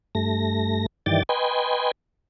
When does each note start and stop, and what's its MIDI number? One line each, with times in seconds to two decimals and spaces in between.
0.15 0.86 43
0.15 0.86 57
0.15 0.86 94
1.06 1.23 43
1.06 1.23 51
1.06 1.23 52
1.06 1.23 74
1.06 1.23 79
1.06 1.23 93
1.29 1.91 71
1.29 1.91 75
1.29 1.91 79
1.29 1.91 80
1.29 1.91 83
1.29 1.91 84